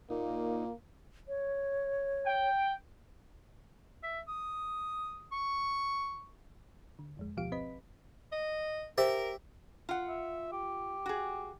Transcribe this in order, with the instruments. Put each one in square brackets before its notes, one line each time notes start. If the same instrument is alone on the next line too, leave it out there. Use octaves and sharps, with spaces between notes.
[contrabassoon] A#2 [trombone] A#3 [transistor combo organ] D#4
[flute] C#5
[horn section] G5
[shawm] E5
D#6
C#6
[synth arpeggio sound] D3
G1 F2 G#3
D2 B2 F3 G4 F5 D7
G#1 C4 B4 D#5 B5 B6
[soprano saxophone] D#5
[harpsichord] G4 E5 [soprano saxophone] A#4 [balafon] C5
[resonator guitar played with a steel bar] F4 F#5
[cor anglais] E5
G4
[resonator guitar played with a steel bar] F#4 G#4